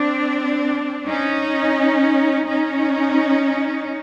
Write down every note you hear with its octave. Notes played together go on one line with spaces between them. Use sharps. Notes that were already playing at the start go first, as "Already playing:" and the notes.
Already playing: C4 D4
C#4 D#4
C#4 D#4